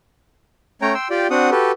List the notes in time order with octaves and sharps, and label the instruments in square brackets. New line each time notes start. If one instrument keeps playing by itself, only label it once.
[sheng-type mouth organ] A3 C#4 C#5 G5 A#5
G5 C6 E6
F4 G4 D5 G5
C4 D4 F#4 F#5 D#6
F#4 G4 A4 B4